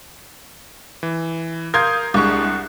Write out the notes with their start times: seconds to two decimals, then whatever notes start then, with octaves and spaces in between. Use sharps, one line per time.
1.03 E3
1.74 A#4 F5 C6 D#6 G6 G#6
2.14 C2 G#3 D4 F#5 C#6